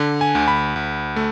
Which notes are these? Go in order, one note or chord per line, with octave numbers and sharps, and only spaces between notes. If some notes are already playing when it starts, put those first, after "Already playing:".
Already playing: D3
G#5
D2
B5
D2
A3